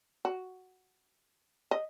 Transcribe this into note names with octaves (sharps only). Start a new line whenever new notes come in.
F#4
D#5